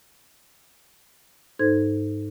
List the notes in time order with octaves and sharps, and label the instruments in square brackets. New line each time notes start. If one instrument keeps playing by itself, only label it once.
[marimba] G#2 D#4 A4 C5 G#6